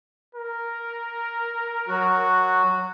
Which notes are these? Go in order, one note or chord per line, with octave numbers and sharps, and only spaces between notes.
A#4
F#3 F#4